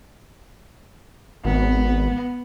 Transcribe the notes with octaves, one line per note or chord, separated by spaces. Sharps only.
G#1 B3